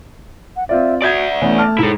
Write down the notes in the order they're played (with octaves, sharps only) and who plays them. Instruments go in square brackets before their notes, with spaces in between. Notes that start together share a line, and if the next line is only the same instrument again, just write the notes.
[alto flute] F#5
[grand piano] C4 F4 D5 [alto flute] E5
[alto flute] F#4 [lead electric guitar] D5 E5 [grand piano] D#6 G6 G#6
[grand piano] E3 B3 C#4 [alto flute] A3
[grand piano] A5 D6 F6
[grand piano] G#2 [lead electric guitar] E4 A4